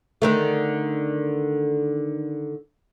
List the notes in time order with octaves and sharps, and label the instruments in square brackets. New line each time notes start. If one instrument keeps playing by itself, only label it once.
[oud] D3 D#3 A3